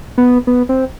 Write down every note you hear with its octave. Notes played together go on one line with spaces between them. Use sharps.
B3
B3
C4